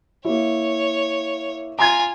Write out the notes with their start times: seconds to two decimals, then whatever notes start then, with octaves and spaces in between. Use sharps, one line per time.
0.25 A#3 E4 C#5
1.79 F4 G#5 A#5 C6 G#6